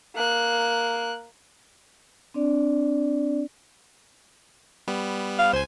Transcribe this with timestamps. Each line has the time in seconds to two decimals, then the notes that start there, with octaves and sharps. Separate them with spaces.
0.16 A#3 F#6
2.34 C4 D4 D5
4.88 G3 B3
5.39 F5
5.53 C#2 C5 G#5